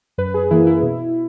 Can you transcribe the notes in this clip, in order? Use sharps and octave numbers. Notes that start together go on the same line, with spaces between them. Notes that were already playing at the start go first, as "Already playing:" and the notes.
F#2 B4
G#4
E3 A#3 E4
E4
B2